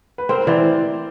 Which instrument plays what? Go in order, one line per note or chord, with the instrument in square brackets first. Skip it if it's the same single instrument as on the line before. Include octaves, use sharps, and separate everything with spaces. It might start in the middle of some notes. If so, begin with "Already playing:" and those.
[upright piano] B4
[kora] C4 [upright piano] A#4 C5
[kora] E3 [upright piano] C5 D5